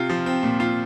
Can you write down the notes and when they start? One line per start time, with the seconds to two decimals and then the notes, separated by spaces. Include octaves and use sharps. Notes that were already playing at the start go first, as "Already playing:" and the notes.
Already playing: C3 F4
0.10 F3
0.26 C4
0.43 A#2
0.60 F4